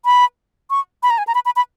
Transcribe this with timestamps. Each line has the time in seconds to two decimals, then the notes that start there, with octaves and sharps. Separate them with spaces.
0.05 B5
0.70 C#6
1.03 B5
1.10 A#5
1.18 G#5
1.27 A#5
1.35 B5
1.45 B5
1.56 B5